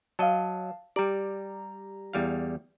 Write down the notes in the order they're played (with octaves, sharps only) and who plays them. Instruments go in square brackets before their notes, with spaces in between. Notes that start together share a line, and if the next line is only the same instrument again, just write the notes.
[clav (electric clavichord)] F#3 D#5 [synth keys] F5 A5
[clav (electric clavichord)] G3 D5 [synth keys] G4 A#5
[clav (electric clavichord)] E2 G3 F5